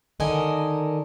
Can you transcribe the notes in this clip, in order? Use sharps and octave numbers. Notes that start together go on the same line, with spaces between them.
D3 D#3 A#4 D#5 G#5